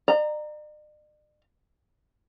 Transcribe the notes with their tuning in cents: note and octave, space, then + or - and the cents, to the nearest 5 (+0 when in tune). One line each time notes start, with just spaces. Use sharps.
D5 +45 A#5 +0